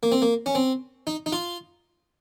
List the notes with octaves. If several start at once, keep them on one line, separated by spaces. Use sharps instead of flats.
A#3
C4
A#3
C#4
C4
D#4
D#4
F4